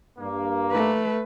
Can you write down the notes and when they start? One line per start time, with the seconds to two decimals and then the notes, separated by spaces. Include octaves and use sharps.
0.19 G2 A#3
0.72 A3 B4